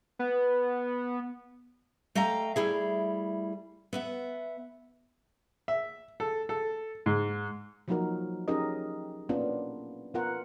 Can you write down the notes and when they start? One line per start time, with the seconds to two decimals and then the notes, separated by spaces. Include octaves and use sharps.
0.19 B3
2.15 A3 D#5 F5 G5 A#5
2.56 G3 A3 E4 G#4
3.93 B3 E5 F#5
5.68 E5
6.20 A4
6.49 A4
7.06 G#2
7.88 F3 F#3 A#3 D#4 F#4 A#4
8.48 C#4 D#4 G4 G#4 A#4 D#5
9.29 A#3 B3 C#4 D4 F4
10.14 B3 F4 A#4 F#5